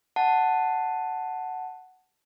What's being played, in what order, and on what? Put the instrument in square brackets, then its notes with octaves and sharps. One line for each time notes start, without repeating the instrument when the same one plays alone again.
[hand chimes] F#5 A5